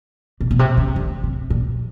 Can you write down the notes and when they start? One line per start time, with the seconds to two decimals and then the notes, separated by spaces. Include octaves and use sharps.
0.40 B2
0.51 B2
0.59 C3
0.77 C#3
0.96 D3
1.23 C3
1.50 A#2